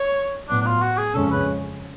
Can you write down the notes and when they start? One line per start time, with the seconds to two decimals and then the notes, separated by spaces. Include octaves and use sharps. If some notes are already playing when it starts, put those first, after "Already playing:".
Already playing: C#5
0.48 A2 F#3 B3 D4
0.61 D4
0.66 F4
0.81 F#4
0.98 G#4
1.14 F2 C#3 G#3 C#4 A4
1.31 B4